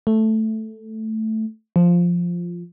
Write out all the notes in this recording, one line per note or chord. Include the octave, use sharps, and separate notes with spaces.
A3
F3